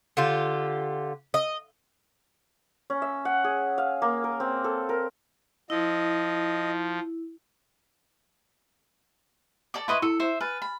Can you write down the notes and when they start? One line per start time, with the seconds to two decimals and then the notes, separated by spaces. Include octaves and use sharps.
0.17 D3 F4 G4
1.34 D#5
2.90 C#4
3.02 E5
3.25 F#5
3.44 G#4
3.78 F5
4.02 A#3
4.24 A#4
4.40 C4
4.64 A4
4.89 A#4
5.70 F3 E4 D#5
9.74 A4 D5 D6
9.88 E4 B4 D#5 C6 C#6 D#7
10.02 E4 A4 E6 C#7
10.20 C5 E5
10.41 B4 G#5 F6 A6
10.62 B5